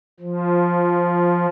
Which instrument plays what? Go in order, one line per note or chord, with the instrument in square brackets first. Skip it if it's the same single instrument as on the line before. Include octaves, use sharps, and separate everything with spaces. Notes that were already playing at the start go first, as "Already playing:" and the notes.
[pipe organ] F3